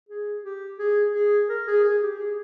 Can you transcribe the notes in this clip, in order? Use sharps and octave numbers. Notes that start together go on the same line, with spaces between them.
G#4
G4
G#4
G#4
A#4
G#4
G#4
G4
G#4